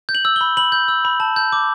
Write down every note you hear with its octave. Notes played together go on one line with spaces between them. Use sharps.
G6
F#7
E6
G7
B5
B5 F#7
G6
E6
B5
A5
G6
D6